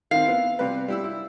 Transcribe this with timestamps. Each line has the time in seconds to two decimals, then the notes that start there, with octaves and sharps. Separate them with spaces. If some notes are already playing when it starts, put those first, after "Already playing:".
0.11 D#3 C4 F5
0.25 B3 E4
0.59 C3 G3 B4
0.88 G3 E4 E6
1.04 E4